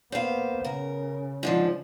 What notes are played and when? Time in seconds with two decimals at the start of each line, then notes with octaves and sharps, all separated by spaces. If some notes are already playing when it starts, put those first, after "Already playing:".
0.12 A#3 B3 C5 F5
0.64 C#3 A#4
1.43 G#2 D3 F3